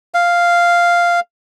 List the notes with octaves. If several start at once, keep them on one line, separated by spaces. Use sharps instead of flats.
F5